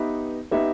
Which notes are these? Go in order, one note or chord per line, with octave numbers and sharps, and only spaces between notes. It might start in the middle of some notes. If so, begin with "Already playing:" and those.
Already playing: B3 D#4 G4 B4 E5
B3 D#4 G4 B4 E5